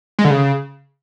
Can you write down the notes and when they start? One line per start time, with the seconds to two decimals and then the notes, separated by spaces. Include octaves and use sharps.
0.19 G#3
0.25 D3
0.31 C#3